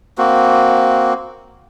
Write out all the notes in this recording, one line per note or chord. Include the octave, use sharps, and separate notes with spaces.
A#3 C4 F#4